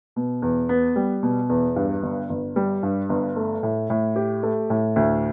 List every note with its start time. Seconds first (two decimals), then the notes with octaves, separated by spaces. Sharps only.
0.16 B2
0.42 E2
0.69 B3
0.96 G3
1.23 B2
1.49 E2
1.76 G2
2.03 G1
2.29 G1
2.56 G3
2.83 G2
3.09 G1
3.36 A3
3.63 A2
3.90 A2
4.16 G4
4.43 A3
4.70 A2
4.96 D2